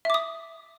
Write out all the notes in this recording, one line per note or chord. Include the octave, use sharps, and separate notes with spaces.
E5 D6 D#6